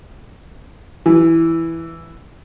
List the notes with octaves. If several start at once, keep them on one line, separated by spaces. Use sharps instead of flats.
E3